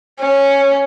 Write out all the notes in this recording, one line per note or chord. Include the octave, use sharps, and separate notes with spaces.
C#4